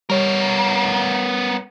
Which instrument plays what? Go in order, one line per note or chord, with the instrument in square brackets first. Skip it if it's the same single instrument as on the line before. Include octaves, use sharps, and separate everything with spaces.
[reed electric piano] G3 C#5 [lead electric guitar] B3 A#4